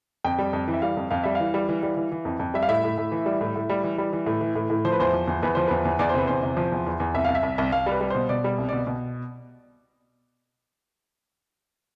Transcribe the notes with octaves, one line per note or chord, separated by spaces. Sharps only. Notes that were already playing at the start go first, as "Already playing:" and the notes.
F2 G5
G3
F2
E3
E5
G3 F5
F2
F2 F5
G3 E5
E3 F5
G3
E3
G3
E3
E3
F2
F2
G3 E5
F5
A2 E5
A2
A2
E3
G3
A2
A2
G3
E3
G3
E3
A2
E3
A2
A2
F3 C5
B4
E2 C5
F3
E2
E2 B4
F3 C5
E2 B4
E2
E2 D5
C5
C3 B4
E2 C5
C3
F3
E2
E2
E2
C2 E5
C2 F5
E5
C2
C2
C2 F5
G3
B4
G3
B2 C5
B2 D5
G3
C2
B2 D5
B2